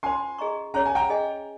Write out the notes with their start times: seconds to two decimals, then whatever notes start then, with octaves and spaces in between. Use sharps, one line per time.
0.03 C#4 F4 C5 G#5 C6
0.38 G#4 D#5 A#5 C#6
0.74 C#4 G#4 C#5 A#5
0.85 G#5
0.95 G5 A#5
1.10 G#4 D#5 G#5